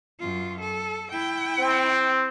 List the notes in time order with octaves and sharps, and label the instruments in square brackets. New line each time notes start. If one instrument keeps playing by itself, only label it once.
[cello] F#2 F4
A4
E4 G5
[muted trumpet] C4